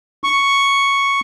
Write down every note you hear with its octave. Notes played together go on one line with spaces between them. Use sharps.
C#6